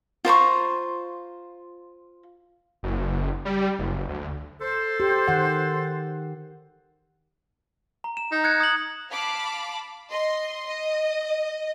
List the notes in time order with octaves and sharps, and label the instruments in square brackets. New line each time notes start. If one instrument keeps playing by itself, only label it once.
[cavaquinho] F4 C5 A#5 C#6
[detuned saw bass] F#1
G3
F#1
D2
[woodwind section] A4 C5
[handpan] G4
D#3 F#5
[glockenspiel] A#5
E7
[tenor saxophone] D#4
[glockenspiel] F#6 G#6 C#7
D#6 F#7
[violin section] F5 A5 B5 D6
D#5 C6
D#5